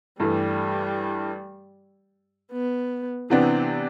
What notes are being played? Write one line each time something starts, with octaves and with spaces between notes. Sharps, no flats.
G2 E3 G3 A3
B3
C3 E3 B3 C4 D4